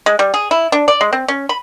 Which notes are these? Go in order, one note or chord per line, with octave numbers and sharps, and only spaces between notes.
G#3
G3
G#4
E4
D4
D5
G#3
C4
C#4
B5